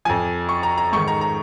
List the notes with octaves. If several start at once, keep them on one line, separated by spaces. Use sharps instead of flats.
F2 F3 G#5
C#6
A#5
A#5
G#2 D#3 C#6
A#5
A#5